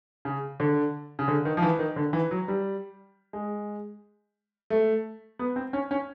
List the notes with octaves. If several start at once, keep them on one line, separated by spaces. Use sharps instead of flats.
C#3
D3
C#3
D3
D#3
F3
E3
D#3
D3
E3
F#3
G3
G#3
A3
B3
C4
C#4
C#4